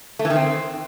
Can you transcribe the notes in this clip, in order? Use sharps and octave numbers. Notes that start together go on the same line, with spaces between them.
A3
E3
D#3
C4